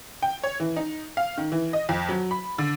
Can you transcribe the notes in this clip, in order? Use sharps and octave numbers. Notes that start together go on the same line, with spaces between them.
G5
C#5
E3
D#4
F5
D#3
E3
D#5
F2
F#3
B5
D3